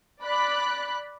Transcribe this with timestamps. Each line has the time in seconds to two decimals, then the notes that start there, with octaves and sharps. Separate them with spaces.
0.22 D5 B5 F#6